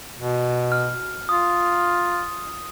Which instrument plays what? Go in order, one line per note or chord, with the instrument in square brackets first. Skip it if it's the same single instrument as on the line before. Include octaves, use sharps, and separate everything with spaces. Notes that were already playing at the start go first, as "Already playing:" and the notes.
[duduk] B2
[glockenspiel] F6
[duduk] F4 [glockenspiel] D#6